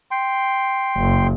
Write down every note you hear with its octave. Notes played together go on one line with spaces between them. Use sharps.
G5 C6
F#1